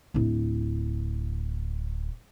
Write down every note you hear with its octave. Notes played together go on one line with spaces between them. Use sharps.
D1 E4